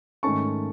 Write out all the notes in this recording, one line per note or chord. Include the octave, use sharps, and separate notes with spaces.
G#2 D#3 A3 C#4 A5 C#6